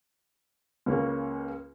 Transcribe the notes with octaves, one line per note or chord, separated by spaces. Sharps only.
C#2 C#3 A#3 C#4